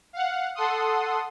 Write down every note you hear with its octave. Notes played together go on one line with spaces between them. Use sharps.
F5 F#5
A4 F#5 C6 D#6